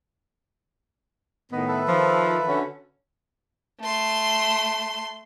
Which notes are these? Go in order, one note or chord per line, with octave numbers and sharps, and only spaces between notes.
A2 D#3 B3 D#5
A4 B4 E5
D#3 F3
D3 C#4 F#4
A3 C6